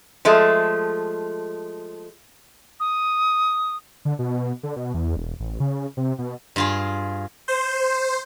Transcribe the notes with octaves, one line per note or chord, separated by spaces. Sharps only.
F3 G#3 A3
D#6
D3
B2
B2
D3
B2
E2
E1
A1
C#3
C3
B2
G2 F4 G#4
C5